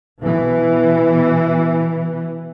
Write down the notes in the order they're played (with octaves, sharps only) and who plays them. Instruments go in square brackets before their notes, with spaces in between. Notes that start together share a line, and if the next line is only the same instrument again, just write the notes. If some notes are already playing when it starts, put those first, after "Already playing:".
[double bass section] B2 E3